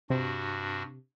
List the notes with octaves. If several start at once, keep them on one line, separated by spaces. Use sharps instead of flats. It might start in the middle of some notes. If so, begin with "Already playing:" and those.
G2 C3 D4 F#4